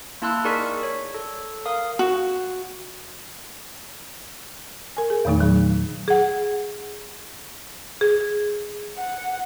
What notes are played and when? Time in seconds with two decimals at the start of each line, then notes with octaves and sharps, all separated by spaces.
0.22 A#3 E4 A5 C6 E6 F#6
0.45 D#4 G#4 A#4 D5 C#6 B6
0.83 C#5
1.14 A4
1.66 A#4 F5 D#6
1.99 F#4
4.97 A#4 G#5
5.10 G#4
5.25 E2 A#2 D#3 A3 D#4
5.40 A#2 F#3
6.08 G#4 F#5
8.01 G#4
8.98 F#5